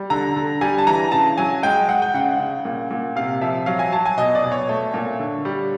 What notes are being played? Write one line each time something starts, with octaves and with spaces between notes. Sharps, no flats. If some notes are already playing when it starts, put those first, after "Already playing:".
Already playing: G3
D3 A#5
D3
G3 G#5
A5
E3 A#5
C#3 A5
F#3 G#5
G#3 G5
G#3 F#5
G5
C#3 F#5
C#3
A#2
A#2
C3 F5
F3 E5
F#3 F5
G#5
F#3 A5
G#5
B2 D#5
D5
B2
C#5
A3
A#2
D3
G3